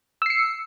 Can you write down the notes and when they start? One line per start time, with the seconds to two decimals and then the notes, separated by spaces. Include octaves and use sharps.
0.22 E6
0.26 C7
0.30 C#7